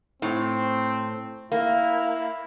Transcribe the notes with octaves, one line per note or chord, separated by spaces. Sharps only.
A2 C4
A#3 E4